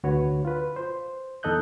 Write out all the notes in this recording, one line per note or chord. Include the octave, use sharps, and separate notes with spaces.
D2 F#4 B4 C#5
F4 B4
C5
E2 D#4 A4 D#5 F#6 G6